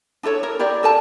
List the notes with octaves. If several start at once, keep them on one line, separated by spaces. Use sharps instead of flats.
D4 E4 A4 C#5
A#4
E4 G4 A#4 D5
A4 A#4 A5